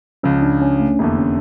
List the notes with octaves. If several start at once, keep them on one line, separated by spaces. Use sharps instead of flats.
C#2 C#3 F3 C#4
D4
C#4
A3
F1 E2 D3 A3 A#3
C#4